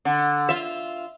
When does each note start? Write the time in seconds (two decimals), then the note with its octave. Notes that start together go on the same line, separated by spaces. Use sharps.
0.05 D3
0.49 F4 E5